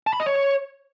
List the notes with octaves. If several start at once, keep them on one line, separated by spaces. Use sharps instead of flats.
A5
B5
D#5
C#5